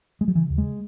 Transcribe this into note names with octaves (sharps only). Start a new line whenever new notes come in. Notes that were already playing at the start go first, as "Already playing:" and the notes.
G#3
F#3
C#3 E3
D#2
G#3